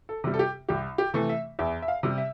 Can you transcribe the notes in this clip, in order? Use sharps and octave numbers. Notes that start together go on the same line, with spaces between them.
A4
C3 G3
A4
G4
C2 G4
G4
C3 E3 A3
E5
E2 E5
E5
F5
C3 G3
E5